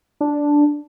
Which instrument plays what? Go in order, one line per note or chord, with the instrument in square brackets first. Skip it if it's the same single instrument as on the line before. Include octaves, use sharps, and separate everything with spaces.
[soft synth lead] D4